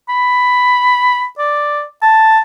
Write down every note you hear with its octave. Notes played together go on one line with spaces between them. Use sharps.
B5
D5
A5